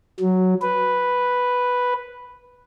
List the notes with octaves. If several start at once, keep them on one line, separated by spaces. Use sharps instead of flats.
F#3
B4